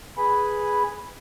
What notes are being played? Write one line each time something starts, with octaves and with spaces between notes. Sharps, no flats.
G#4 B4 G#5 B5